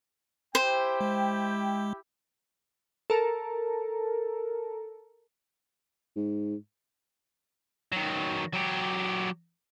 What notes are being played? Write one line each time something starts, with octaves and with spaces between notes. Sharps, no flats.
E4 G4 C5 G5
G#3
A4 A#4
G#2
D#3 F#3
F#3 G4